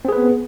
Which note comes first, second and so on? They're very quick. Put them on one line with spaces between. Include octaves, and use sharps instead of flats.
C4 G#4 B4 B3